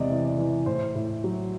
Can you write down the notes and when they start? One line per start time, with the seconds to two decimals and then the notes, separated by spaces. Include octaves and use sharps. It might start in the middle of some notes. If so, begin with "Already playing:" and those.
Already playing: E2 C3 G#3 D5 D#5
0.10 E3
0.24 D5
0.38 E3
0.66 A2 C5
0.95 A2
1.24 F#3